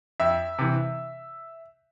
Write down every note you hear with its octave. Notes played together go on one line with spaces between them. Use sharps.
F2 E5
C3 E3